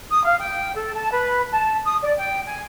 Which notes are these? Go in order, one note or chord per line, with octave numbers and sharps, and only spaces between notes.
D#6
F5
G5
A4
A5
B4
A5
D#6
D5
G5
G#5